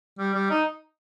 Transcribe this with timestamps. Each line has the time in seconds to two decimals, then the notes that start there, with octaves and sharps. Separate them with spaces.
0.18 G3
0.34 G3
0.50 D#4